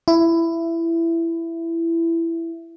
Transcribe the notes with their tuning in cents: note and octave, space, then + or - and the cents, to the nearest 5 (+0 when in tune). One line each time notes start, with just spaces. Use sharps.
E4 +15